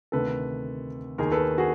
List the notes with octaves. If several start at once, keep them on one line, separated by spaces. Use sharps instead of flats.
D2 C3 D#3 A4 B4
D#2 D#3 G#4 A#4
A4 B4
F#4 G#4